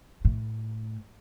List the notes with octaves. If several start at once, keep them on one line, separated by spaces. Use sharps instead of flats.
A2